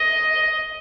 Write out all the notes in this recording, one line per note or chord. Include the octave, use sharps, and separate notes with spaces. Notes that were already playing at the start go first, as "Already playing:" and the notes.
Already playing: D#5